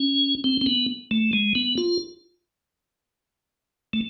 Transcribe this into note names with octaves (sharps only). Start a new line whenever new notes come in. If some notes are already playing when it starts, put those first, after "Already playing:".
Already playing: C#4
C4
C4
B3
A3
G#3
B3
F4
A3